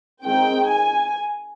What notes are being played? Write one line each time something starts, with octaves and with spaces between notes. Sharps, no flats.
D#3 G#3 C4 D#4 G5
G#5